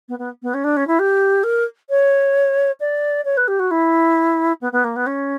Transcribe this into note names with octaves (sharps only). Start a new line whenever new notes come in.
B3
B3
B3
C#4
D4
C#4
E4
G4
A#4
C#5
D5
C#5
B4
G4
F#4
E4
B3
B3
A#3
B3
C#4